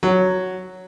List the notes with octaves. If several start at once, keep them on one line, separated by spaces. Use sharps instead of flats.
F#3